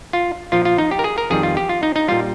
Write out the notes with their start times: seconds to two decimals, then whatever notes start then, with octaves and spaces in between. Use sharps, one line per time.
0.13 F4
0.52 A#2 F3 F4
0.65 F4
0.78 D#4
0.91 G4
0.99 A#4
1.04 G#4
1.18 A#4
1.30 F2 D#3 G3 G#4
1.43 F4
1.57 G4
1.69 F4
1.83 D#4
1.96 D#4
2.08 A#2 G3 F4